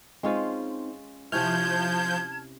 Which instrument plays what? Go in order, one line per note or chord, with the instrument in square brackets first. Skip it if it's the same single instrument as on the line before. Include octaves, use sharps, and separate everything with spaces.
[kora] G#3 C#4 F4 [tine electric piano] C4 D#4 C5
[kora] C3 C#4 E4 [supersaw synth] F3 G6 [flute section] A5 G#6 [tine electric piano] F6